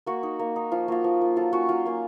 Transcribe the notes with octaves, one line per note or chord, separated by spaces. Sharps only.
A#3 F#4
D#4
A#3
D#4
F3 F4
A#3 F4 F#4
F3
A#3 F4
F#3 F4 A4
A#3 C#4 F4 F#4
F#3 F4
A#3 C#4 F4